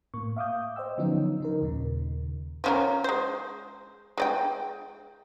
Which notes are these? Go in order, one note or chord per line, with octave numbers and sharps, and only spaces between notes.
A2 A#3 C#6
E5 F5 D6 D#6 G6
C5 D#5 G5 E6
D3 F3 F#3 B3 C#4 D#4
C#3 D#4 A#4
D#2 A#2 C#3
F3 C#4 A#4
G#3 C5
G#3 D5 G5